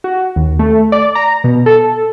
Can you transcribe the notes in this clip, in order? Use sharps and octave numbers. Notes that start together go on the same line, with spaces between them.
F#4
D#2
A3
D5
A#5
B2
A4